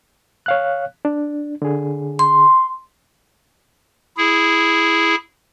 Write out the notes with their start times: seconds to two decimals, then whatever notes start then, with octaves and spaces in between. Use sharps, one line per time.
0.46 C#5 F5 F#6
1.05 D4
1.62 D3 G#4
2.19 C6
4.17 E4 G#4